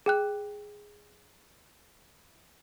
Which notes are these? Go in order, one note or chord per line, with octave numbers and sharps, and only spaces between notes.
G#4 G5 F#6